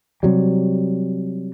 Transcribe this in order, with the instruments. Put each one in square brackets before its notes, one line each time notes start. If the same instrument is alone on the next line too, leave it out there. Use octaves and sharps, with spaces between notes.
[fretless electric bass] C3 F#3 G3